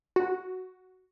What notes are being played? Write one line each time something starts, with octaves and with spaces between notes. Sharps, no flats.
F#4